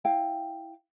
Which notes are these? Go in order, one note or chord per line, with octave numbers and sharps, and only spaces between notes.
E4 F5 G5